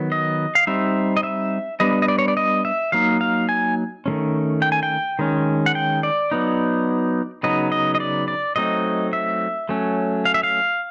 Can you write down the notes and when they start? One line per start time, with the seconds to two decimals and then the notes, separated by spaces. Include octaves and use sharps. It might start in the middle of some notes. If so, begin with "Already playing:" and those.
Already playing: D#3 F#3 B3
0.12 D#5
0.55 F5
0.67 G3 C4 D#4 E5
1.17 D#5
1.23 E5
1.80 G3 B3 D4 D#5
2.02 D#5
2.08 D5
2.18 C#5
2.28 D5
2.37 D#5
2.65 E5
2.92 F#3 A#3 D#4 F5
3.21 F5
3.49 G#5
4.06 D#3 F#3 A3 C#4
4.62 G5
4.72 G#5
4.83 G5
5.19 D#3 G#3 C#4
5.66 F#5
5.75 G5
6.03 D5
6.32 F#3 B3 D#4
7.43 C#3 F#3 B3 D#4 D#5
7.72 D#5
7.95 D#5
8.00 D5
8.28 D5
8.56 F#3 A3 C4 D#4 D#5
9.13 E5
9.69 F#3 A3 C#4
10.25 F5
10.34 E5
10.43 F5